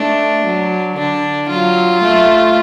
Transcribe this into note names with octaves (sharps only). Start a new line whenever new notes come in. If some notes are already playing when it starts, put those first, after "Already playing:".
Already playing: A3 D4
F#3
D3 D4
F#3 F4
A3